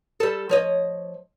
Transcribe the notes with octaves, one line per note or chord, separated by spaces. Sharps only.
G3 A4
F3 C#5 D#5